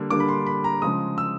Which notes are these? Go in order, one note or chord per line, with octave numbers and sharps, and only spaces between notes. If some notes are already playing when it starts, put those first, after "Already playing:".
Already playing: D3 G3 A#3 D4
D3 G3 A#3 D4 D6
B5
C6
B5
A#5
C#3 F3 G#3 D#6
E6